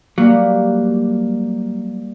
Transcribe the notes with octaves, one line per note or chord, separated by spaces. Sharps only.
F#3 G3 A#3